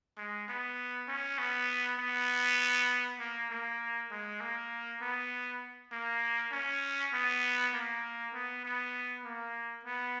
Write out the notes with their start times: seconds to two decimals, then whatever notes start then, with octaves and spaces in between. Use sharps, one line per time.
0.17 G#3
0.48 B3
1.08 C#4
1.39 B3
1.99 B3
3.20 A#3
3.51 A#3
4.11 G#3
4.41 A#3
5.01 B3
5.92 A#3
6.52 C#4
7.13 B3
7.74 A#3
8.34 B3
8.65 B3
9.25 A#3
9.85 B3